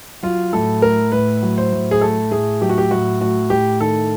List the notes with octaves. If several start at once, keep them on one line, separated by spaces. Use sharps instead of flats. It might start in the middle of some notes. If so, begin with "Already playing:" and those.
F#3 F4
A2 A4
A3 A#4
A2 B4
F#3
C5
A2
G#4
A3 A4
A2 G#4
F#3 G4
F#4
G4
A2 F#4
A3 F#4
A2 G4
D#3 A4